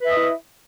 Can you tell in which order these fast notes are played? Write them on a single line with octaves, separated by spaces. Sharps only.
B4 E5 D#5 E4